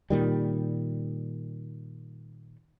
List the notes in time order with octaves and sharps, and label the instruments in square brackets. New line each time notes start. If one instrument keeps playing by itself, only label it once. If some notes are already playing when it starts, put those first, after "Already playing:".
[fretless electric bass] A#2 D#3 G3